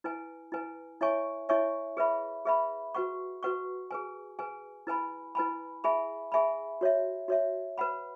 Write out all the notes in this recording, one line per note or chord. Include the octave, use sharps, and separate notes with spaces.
E4 B4 G#5
E4 B4 G#5
E4 C#5 E5 G#5 C#6
E4 C#5 E5 G#5 C#6
G#4 B4 E5 B5
G#4 B4 E5 B5
F#4 B4 F#5 C#6
F#4 B4 F#5 C#6
G#4 B4 G#5
G#4 B4 G#5
E4 B4 G#5 B5
E4 B4 G#5 B5
G#4 E5 G#5 B5
G#4 E5 G#5 B5
F#4 C#5 E5
F#4 C#5 E5
B4 F#5 B5